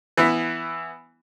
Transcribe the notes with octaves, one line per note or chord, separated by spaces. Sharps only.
E3 B3 E4